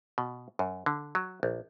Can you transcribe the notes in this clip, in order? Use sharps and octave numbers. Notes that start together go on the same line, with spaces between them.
B2
F#2
D3
F#3
A#1